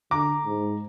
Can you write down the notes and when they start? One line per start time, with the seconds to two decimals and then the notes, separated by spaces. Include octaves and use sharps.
0.11 D3 A#5 D6
0.45 G#2